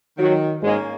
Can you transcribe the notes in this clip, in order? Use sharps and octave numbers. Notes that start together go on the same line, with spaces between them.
D#3 F#3 F#4
G#2 G#3 A#3 C#4